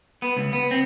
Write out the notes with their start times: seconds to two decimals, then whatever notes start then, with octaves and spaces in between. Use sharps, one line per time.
0.22 B3
0.36 C#2
0.53 B3
0.71 C4